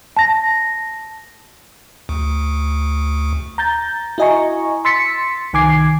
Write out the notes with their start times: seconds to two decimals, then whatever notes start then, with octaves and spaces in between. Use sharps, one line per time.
0.17 A5 A#6
2.09 D2
3.58 A#5 G6 A6
4.18 E4 F#4 D#5 G#5 A#5 C#6
4.85 C6 E6 A6 B6 C#7
5.53 C2 D#3 G#5 D6 G#6 C7